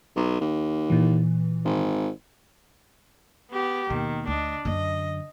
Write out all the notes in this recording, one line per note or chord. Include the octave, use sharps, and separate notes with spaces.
B1
D#2
A#2 E3
G#1
B3 G4
D#2 B2 D#3
D2 D4 D#5
F#2 D3 D#5